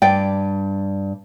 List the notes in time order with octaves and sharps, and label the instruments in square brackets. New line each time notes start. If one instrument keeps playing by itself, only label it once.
[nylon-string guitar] G2 D5 [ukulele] G5